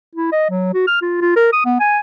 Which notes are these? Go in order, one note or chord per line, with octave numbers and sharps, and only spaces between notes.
E4
D#5
F#3
F#4
F6
F4
F4
A#4
D#6
B3
G#5